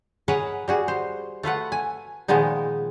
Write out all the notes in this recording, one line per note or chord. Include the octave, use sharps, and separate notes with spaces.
G#4 A#4 B4 C#5 D#5 F#5
G3 F#4 G#4
C5
A3 F4 B4 F#5
G#5
A#2 D#3 F3 G#3 B3 D#4